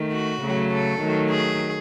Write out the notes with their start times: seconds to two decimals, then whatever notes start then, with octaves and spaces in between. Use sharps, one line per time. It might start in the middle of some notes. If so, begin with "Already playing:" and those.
Already playing: D#3 A3
0.11 F#4
0.41 C#3 F#3 A3
0.71 A4
1.00 D#3 F#3 A3
1.30 G#4